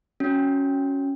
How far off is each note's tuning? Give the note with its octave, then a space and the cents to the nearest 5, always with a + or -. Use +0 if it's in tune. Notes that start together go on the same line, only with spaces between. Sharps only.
C#4 +0 F#4 +0